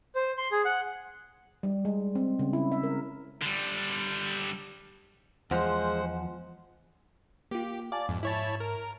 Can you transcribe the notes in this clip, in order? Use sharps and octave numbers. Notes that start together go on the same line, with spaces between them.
C5
C6
G#4
F#5
G3
G#3
C4
C#3
E4
E5
A#4
D3 G3
E2 F3 G#3 C5 F#5
A#3 F4 G4
D5 F5 G#5 A5
F2 G#2
E4 C#5 A5
A#4